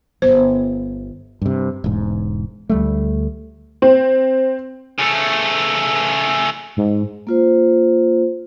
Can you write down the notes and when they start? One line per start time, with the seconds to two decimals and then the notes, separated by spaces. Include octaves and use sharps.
0.22 G1 C5
1.42 G2 C3
1.84 E1 G#2
2.69 D2 G3 A3
3.82 C4
4.99 C#3 A3
6.77 G#2
7.27 A#3 F4 C5